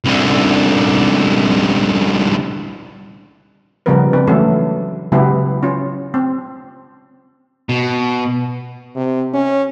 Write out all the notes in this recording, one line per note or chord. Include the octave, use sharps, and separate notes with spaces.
C2 D3
C#3 F3 G3 B3 A#4 B4
C4 D4 B4
E3 F#3 G#3 A3 C#4 A4
C#3 F#3 G#3 B3 E4 G4
C#4 F4
C4
B2
C3
C#4